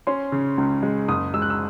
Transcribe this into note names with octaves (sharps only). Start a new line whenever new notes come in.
C#4 C6
C#3
C#2
G#3
F#1 D#6
G#3 E6
F#6
E6